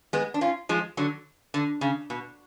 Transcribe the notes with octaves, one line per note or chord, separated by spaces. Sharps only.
G#3 B3
D4
C#4 F4
F3 G#3
D3 F#3
D3
C#3
B2